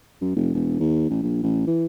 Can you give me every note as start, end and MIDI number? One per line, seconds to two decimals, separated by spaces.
0.21 0.32 42
0.35 0.50 29
0.54 0.77 28
0.79 1.05 39
1.09 1.22 33
1.22 1.39 34
1.43 1.67 33
1.67 1.86 52